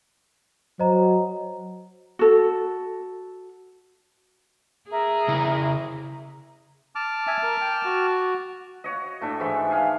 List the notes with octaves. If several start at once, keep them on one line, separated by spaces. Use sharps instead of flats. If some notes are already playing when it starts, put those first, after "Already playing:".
F#3 C5 D#5 A#5
F#4 A4
G#4 A#4 E5
C#3 E4
A5 D6 F6
E5 G#5
A#4
G5
F#4
F#4 C#5 D#5
A2 D4 E5
G#2 E3 G#3 E5
G#4 F5 G5